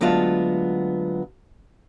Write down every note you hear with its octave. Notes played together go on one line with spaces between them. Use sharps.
D2 F#3 G#3 B3 F4 A5